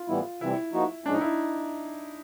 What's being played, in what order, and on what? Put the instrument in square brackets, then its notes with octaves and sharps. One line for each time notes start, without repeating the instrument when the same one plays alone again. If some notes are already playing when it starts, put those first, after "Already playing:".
Already playing: [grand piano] F4
[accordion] A2 E3 G3 B3 E4
[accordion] C3 E3 G3 C4 [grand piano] E4
[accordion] F3 A#3 D#4 F#4
[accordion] A2 F3 G#3 C#4 [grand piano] D4
[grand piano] D#4
E4